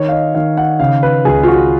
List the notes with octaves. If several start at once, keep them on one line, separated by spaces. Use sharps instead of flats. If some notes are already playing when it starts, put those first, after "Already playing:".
Already playing: D#3 C#5
F5
D#5
D#3 F5
F#5
C#3 F5
B4
C#2 G#4
F4
F#4